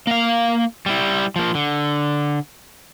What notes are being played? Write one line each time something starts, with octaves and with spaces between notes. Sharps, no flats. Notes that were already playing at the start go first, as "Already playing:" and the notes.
A#3 F5
G3 E4
F3 A#3
D3